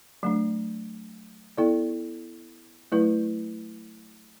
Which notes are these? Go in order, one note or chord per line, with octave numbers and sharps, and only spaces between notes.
F#3 A3 D4
B3 E4 A4 D5
F#3 A3 E4 B4